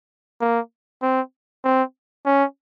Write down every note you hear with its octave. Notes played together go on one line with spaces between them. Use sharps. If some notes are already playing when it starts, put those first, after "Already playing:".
A#3
C4
C4
C#4